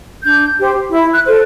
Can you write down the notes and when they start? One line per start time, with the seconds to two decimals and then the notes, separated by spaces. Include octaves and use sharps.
0.24 D4 G6
0.59 G4 C5
0.92 E4
1.14 F#6
1.25 A4 C5